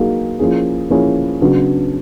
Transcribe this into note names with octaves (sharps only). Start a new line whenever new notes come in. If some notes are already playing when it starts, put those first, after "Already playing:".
Already playing: F#3 A#3 D#4 G#4
F3 A#3 C#4 E4 G#4
F3 A#3 C#4 E4 G#4
C#3 F#3 B3 D4